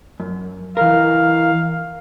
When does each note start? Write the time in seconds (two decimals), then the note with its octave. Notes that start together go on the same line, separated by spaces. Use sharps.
0.20 F#2
0.77 E3 A#4 F5